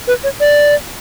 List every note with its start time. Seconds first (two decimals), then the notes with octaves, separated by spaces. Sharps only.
0.08 B4
0.24 C#5
0.40 D5